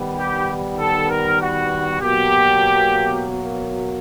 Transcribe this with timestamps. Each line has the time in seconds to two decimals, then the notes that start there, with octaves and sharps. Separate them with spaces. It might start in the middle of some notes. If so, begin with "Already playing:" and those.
Already playing: D#3 G3 B3
0.19 G4
0.79 A4
1.09 A#4
1.41 F#4
2.01 B2 F#3 A#3 G4